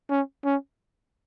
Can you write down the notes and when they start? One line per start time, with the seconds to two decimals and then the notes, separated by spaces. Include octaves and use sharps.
0.10 C#4
0.45 C#4